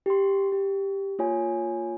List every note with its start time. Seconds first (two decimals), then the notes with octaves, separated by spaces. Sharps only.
0.06 G4 C6
0.52 G4
1.19 A#3 F4 C#5 G#5